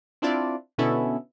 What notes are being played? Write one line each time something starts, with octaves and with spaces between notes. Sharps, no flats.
C4 D4 E4 F4 D5
B2 D3 B3 C#4 E4 A4